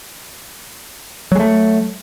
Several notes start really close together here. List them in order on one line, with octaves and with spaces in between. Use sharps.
F#3 G#3 A3